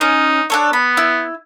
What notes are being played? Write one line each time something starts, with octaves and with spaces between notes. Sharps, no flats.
C#4 D#4
D4 A4 C#5
B3 B5
E4 E6